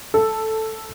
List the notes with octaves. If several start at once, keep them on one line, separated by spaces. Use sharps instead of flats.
A4